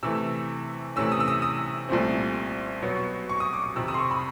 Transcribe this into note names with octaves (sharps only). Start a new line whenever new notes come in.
C3 E3 A3 E6
C3 E3 A3 C#4 E6
D#6
E6
D#6
D#6
C2 A#2 F3 A3 C4
B2 F#3 B3
C#6
D#6
D6
D#6
F2 C3 D#3 E6
D#6
C6
C#6
B5